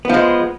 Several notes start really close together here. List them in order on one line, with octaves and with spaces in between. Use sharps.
B3 F3 G#3